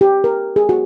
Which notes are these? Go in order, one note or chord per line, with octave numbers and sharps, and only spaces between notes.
G4
A#4
G#4
F#4